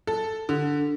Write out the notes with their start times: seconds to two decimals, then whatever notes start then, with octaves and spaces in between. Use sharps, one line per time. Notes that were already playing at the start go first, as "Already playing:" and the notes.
0.07 A4
0.49 D3